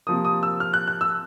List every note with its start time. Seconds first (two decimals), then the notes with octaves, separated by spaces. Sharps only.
0.07 C3 F3 A#3 D#6
0.25 D#6
0.43 E6
0.60 F6
0.74 F#6
0.87 F#6
1.01 E6